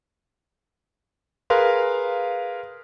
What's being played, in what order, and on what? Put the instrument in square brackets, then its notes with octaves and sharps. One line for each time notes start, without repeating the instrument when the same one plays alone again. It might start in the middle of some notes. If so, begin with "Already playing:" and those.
[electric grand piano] G#4 A#4 B4 F5 C6